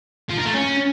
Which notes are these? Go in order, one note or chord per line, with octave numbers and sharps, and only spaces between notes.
F3
A#4
A3
C#4